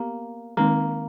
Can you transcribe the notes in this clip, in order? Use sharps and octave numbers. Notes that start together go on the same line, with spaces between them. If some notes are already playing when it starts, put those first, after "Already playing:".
Already playing: A#3 B3 G4
D#3 G#3 A#3 C4 D#4